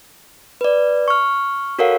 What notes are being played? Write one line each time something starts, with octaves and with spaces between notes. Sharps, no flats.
B4 D5
C#6 F6
F#4 A4 A#4 C#5 F5 F#5